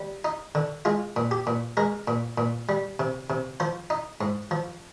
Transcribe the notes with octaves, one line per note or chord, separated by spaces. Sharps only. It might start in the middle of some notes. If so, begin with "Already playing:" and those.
Already playing: G3
D#4
D3
G#3 F4
A#2
G4
A#2
G#3 A#4
A#2
A#2
G3
C3
C3
F3 C5
D#4
G#2
F3